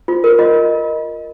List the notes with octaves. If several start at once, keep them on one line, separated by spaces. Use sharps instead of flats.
F4
A#4
F4 D#5